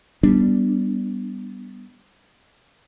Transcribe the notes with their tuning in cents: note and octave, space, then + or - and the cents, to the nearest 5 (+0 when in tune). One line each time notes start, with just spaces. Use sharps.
G3 +0 B3 +0 D4 -5